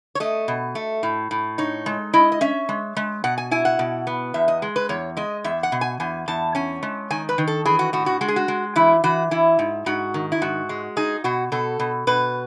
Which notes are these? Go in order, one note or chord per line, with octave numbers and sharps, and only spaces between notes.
C#5
A3 D#5
B2
A3
A2
A2
D#4 C#5
G#3
E4 D#5
D#5
C#4 E5
G#3
G#3
B2 F#5
G#5
E4 G#5
F#5
B2
B3
E2 E5
D#5
G#3
B4
E2 C#5
G#3 D#5
E2 E5
F#5
B2
G#5
E2 G#5
E2 A5
C#4 G#5
G#3
D#3 G#5
B4
D#3
A4
E3 G#4
F#4
A2 F#4
F#4
G#3 F#4
G#4
F#4
G#3
E3 E4
E3 F#4
E3 E4
G#2
G#2 F#4
D#3
E4
G#2 F#4
G#3
D#4 G#4
B2 F#4
B2 A4
B2
B2 B4